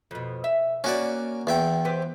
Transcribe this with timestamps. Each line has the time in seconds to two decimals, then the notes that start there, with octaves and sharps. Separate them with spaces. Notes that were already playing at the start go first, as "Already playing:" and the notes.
0.11 F2 B2
0.44 E5
0.84 A#3 C#4 F#4 D5
1.47 E2 E5 G5
1.85 C4 G4 B4